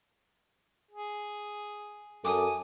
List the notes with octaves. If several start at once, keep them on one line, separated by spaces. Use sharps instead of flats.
G#4
F#2 A4 G#5 D6 D#6